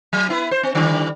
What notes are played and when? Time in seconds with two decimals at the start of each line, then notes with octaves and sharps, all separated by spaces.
0.13 F#3
0.28 B3 E4 B4
0.51 C5
0.63 C4
0.75 D3 D#3 G3